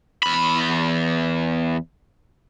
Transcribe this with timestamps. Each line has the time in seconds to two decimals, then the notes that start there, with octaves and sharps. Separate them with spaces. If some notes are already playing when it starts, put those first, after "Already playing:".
0.23 E2 B5